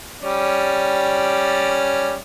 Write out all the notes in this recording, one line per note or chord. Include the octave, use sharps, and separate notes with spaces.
G3 C#4 D5